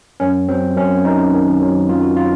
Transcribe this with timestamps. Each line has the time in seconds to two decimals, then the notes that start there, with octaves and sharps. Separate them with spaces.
0.20 F#2 C#4
0.49 F#3 C4
0.76 F#2 C#4
1.05 F#2 D#4
1.32 D#3
1.61 F#3
1.88 F#2 F4
2.02 F#4
2.16 F4